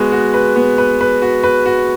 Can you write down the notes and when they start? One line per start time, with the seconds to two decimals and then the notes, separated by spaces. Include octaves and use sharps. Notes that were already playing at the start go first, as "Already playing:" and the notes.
Already playing: G#3 B3 F#4
0.12 F#4
0.34 B4
0.56 B3
0.78 B4
1.01 B4
1.22 F#4
1.44 B4
1.66 F#4